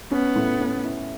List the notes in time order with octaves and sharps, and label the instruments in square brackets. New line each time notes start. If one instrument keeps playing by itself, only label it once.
[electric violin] B3 [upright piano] C#4
[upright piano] A2
C#4
E4